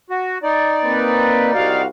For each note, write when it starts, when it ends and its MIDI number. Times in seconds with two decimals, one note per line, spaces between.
0.10 0.38 66
0.43 1.82 63
0.43 1.82 74
0.84 1.52 58
0.84 1.52 60
0.84 1.52 71
1.54 1.85 36
1.54 1.85 66
1.54 1.85 77